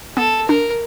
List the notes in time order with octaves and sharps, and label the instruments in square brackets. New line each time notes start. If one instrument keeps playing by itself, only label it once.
[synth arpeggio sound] B3 [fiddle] A4
[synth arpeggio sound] D4 [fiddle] A#4